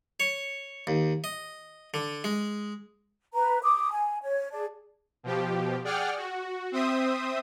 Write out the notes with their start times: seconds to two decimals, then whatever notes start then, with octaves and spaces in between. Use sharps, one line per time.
0.20 C#5
0.87 D#2
1.24 D#5
1.94 D3
2.24 G#3
3.34 B4 A#5
3.63 D6 D#6
3.91 G#5
4.23 C#5
4.52 G#4 D5 A5
5.23 B2 F3 G4
5.84 G#4 D5 F#5 G5 F6
6.17 F#4
6.72 C4 C5 E5 D#6